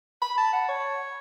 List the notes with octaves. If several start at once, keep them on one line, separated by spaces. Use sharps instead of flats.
B5
A5
F#5
C#5